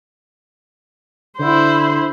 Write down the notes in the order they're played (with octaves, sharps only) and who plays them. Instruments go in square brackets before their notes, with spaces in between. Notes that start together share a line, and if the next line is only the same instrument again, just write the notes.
[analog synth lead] D3 [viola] E4 C5